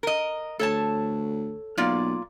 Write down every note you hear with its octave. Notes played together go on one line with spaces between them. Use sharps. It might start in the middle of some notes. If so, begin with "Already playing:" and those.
A#4 D#5
D2 A4 C#5 A5
B1 A#3 F4 D5